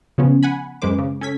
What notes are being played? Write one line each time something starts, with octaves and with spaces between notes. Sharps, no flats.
C#3 F3 B3 C#4
F#5 G#5 B5
F#2 G#3 B4 C5 D6
C#3
C#4 A4 G#6 B6